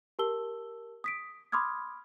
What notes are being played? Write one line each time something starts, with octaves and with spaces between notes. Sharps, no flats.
G4 A#4 A5 E6 G7
D#6 B6 D7
B5 C6 D6 D#6 F6 G#6